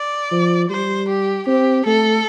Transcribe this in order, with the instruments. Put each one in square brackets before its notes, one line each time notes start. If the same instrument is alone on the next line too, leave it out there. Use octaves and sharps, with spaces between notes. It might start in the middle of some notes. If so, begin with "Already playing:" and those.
Already playing: [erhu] D5
[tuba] F3
[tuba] G3 [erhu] C5
[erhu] G4
[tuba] C4 [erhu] G4
[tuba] A3 [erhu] A4